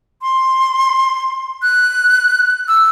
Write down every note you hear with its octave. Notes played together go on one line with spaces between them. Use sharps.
C6
F#6
E6